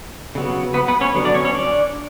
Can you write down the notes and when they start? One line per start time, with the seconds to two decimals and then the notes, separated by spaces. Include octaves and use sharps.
0.35 C#3 F#3 B3
0.74 B3 B4
0.88 B3 B4
1.01 C#4 C#5
1.14 D3 F#3 B3
1.25 D4 D5
1.34 C#4 C#5
1.45 C#4 C#5
1.54 D4 D5